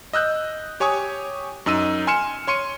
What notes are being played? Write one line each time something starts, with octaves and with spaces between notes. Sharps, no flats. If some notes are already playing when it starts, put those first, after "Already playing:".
D#5 E6 F#6 G6
G4 C#5 G#5 C#6 D#6
F#2 D#4 E6 D#7
G#5 C6 F6 C#7 E7
C#5 C6 C#7 D#7